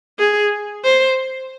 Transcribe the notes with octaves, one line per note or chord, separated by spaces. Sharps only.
G#4
C5